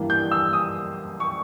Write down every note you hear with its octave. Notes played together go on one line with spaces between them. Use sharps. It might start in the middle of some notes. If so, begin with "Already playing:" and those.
Already playing: G2 E3 G3 A#3
G6
E6
D#6
C#6